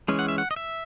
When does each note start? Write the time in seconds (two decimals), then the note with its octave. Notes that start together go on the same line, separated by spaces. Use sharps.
0.08 E3 G#3 C#4
0.19 F#5
0.28 E5
0.38 F#5
0.51 D#5
0.56 E5